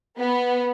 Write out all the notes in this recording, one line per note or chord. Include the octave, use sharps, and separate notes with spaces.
B3